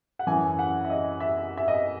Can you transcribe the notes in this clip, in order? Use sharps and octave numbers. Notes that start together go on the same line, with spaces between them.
F#5
F#2 E3 G#5
F#5
E5
D#5
E5
E5
D#5